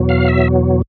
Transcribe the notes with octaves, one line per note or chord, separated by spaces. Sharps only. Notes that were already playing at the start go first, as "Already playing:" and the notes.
Already playing: E2 B2 F#3
F5
E5